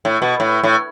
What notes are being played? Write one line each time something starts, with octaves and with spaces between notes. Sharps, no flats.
A2
B2
A2
A2